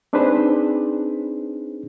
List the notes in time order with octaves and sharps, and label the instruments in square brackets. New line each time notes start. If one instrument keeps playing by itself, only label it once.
[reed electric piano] C4 D4 D#4 G#4 B4 C5